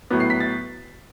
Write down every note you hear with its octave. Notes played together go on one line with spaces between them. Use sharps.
A2 F#3 B3
C7
B6
A6